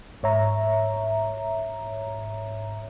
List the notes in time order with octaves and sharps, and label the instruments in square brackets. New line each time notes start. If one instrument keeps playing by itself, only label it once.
[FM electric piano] G#2 C#5 E5 A#5